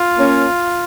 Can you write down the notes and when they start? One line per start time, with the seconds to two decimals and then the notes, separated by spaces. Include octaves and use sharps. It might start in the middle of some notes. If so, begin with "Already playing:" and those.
Already playing: F4
0.18 A#3 C#4